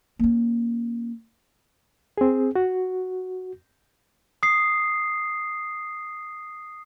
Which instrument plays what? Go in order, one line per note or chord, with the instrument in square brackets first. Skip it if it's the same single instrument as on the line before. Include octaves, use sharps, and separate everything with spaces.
[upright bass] A#3 C#4
[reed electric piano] C4 G#4
F#4
[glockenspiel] D#6 C7